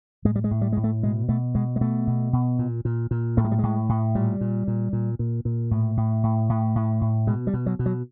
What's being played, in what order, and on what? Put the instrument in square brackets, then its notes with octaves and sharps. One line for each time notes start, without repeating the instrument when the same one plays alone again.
[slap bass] A2 G#3
G3
G#3
A2
G3
A2 G#3
A3
B2 G#3
B2 A3
B2 G#3
G#3
B2 A3
B2
B2
A#2
A#2
A#2
A2 A3
G#3
G3
A2 G#3
A2
A#2 G3
A#2
A#2
A#2
A#2
A#2
A2
A2
A2
A2
A2
A2
B2 G#3
G3
B2
F#3
B2
F#3